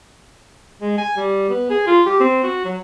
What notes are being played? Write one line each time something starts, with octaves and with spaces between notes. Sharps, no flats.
G#3
G#5
G3
B3
G#4
F4
G4
C4
F#4
F#3